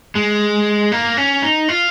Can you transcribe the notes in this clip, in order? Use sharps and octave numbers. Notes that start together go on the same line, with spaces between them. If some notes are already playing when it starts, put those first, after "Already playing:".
G#3
A#3
C#4
D#4
F4